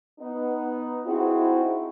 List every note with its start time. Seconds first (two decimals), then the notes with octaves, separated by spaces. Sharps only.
0.20 B3 D#4
1.05 C4 D#4 E4 F#4 G#4 C5